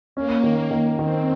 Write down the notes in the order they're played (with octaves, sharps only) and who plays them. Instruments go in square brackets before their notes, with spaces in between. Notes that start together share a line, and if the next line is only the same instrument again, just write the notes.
[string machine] A#3 [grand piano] C#4
[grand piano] D#3
D#3
[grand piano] D#3 [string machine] C4